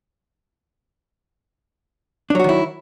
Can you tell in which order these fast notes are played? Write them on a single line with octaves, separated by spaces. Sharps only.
D4 F#3 F#4 D#3 E4